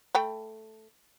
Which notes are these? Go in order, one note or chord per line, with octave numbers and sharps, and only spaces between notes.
A3 G5 B5